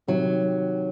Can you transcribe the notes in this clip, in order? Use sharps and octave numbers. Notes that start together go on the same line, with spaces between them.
C3 D#3 F#3